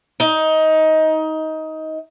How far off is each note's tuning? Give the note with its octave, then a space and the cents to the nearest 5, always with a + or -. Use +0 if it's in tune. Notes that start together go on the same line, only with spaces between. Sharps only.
D#4 +20